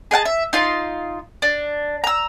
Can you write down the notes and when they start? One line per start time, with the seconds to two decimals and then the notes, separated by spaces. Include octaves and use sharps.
0.11 G#4 D#5 F#5 A5
0.25 E5
0.53 D#4 F4 C6
1.42 D4
2.04 A#5 E6